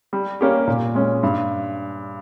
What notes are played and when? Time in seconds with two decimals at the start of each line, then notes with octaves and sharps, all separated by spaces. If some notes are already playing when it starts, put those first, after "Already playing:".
0.13 G3
0.41 A#3 C#4 G4
0.67 A#2
0.95 G#3 C#4
1.23 G2